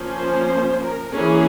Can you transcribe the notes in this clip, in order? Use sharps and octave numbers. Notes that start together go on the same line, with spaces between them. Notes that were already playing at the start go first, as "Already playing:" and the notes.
Already playing: F3 A#3 C#4
C5
A#4
E3 A#3 C#4 G#4